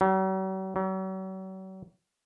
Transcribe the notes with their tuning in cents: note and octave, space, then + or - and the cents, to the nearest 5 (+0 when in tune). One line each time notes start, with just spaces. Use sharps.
F#3 +45
F#3 +40